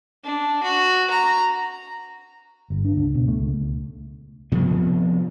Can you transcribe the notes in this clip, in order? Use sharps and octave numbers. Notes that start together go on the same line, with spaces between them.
D4
F#4
A#5
G1
D4
C#2
B2
A3
C#2
D2 C3 F3 B3